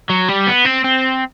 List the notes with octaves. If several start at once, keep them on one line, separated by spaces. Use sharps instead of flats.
F#3
G3
B3
C4
C4